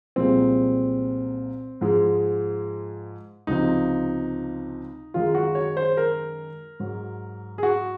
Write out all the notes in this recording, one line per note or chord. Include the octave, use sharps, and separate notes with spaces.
C2 A#2 F3 G#3 C4
G#2 F3 G#3
C#2 C3 F3 D#4
F#2 D#3 G#3 F4
F#4
C#5
C5
A#4
G#2 F#3
G#4
F#4